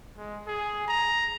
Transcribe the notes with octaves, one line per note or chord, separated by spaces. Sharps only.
G#3
G#4
A#5